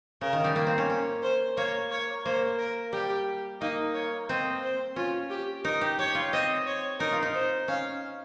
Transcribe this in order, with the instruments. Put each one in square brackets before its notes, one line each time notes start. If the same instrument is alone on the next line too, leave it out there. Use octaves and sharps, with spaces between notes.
[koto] C#3 [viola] A#4
[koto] D#3
G3
A#3
C4
C#4
C#4
[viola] C5
[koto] A#3 [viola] C#5
[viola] C#5
[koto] A#3 [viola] C5
[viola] A#4
[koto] G3 [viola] G4
[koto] A#3 [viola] D#4
[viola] C#5
[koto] C4 [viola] D#5
[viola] C5
[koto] C#4 [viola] F4
[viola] G4
[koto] D#4 [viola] A#4
[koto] G4
[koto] G4 [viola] C#5
[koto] F4
[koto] C4 [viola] D#5
[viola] C#5
[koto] D#4 [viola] A#4
[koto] F4
D#4
[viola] C5
[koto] C#4 [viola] F5